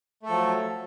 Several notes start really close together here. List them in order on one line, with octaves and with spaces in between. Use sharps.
A3 A4 F3 F#3